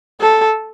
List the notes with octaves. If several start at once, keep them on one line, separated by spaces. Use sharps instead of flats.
A4